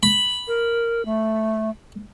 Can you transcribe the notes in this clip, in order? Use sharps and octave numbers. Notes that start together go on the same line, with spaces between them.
B5
A#4
A3